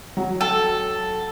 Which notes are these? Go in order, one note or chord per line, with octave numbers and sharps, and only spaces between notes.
F#3
A4